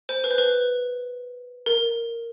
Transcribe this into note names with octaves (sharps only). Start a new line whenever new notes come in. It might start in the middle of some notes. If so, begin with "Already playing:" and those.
C5
B4
C5
B4
A#4